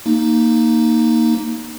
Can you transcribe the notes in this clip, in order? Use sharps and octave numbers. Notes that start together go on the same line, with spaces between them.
A#3 D#4